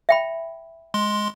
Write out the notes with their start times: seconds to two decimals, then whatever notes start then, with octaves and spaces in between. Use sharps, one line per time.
0.09 E5 G5 B5
0.94 G#3 C6